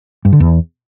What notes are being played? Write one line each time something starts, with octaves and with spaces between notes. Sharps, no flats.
G2
D3
E2